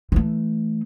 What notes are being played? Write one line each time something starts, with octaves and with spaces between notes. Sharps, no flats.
E3 A3